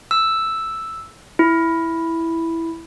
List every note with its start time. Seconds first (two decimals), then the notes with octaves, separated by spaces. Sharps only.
0.11 E6
1.39 E4